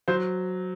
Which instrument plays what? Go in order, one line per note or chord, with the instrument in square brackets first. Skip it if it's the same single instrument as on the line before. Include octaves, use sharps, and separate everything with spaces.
[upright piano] F#3 C5